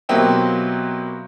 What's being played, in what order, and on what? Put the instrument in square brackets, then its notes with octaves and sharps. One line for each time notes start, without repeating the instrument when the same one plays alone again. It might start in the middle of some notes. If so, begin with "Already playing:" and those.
[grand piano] B2 F#3 A#3 C4 E4 G4